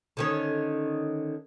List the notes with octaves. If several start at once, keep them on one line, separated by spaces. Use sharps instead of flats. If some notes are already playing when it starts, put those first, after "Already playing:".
D3 D#3 C#4